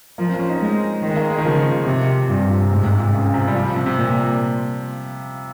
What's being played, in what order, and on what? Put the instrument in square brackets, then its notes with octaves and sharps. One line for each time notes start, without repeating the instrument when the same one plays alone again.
[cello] F3 [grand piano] A#3
[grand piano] C4
C#4
D#4
[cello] G#3
D#3
[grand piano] G#3
A#3
G#3
D#3
[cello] C#3 [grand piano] F3
[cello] C3
[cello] G2 [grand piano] A#2
[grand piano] C3
A#2
C3
[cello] G#2 [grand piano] C3
[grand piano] C3
A#2
C#3
A#2
C3
G3
F3
F3
C3
C3
[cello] A#2